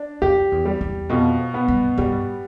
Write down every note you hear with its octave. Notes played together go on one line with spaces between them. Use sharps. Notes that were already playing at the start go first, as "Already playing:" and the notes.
Already playing: D4
F2 G4
E2
G3
E2
F2 B2
B3
G2
G2 G3